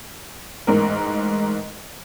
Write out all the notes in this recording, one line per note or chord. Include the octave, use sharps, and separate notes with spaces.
A1 G#2 A#4